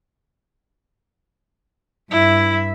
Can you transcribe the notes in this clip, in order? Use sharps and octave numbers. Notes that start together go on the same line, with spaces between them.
G2 E4 E5